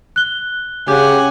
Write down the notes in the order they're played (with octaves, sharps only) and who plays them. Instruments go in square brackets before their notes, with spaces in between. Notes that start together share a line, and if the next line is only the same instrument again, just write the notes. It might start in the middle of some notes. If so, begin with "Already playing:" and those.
[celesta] F#6 G7
[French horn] C#3 [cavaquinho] G4 [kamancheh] F#5 G#5